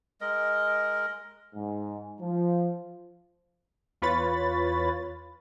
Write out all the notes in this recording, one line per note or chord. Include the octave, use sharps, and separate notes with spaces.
G#3 A#4 D#5
G#2
F3
E2 F4 B4 C#5 B5 A6